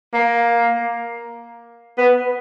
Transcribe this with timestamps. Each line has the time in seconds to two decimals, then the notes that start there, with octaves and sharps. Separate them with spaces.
0.13 A#3
1.97 B3